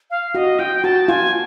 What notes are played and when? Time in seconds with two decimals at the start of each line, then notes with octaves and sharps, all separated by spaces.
0.10 F5
0.35 F#4 D#5
0.59 F4 G5
0.84 F#4 A5
1.08 F4 G#5